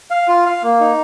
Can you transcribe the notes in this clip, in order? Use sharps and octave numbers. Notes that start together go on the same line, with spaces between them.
F5
F4
F5
A#3
D#4